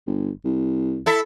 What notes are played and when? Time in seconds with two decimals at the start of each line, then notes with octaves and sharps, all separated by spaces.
0.07 G1
0.45 C2
1.06 E4 A4 E5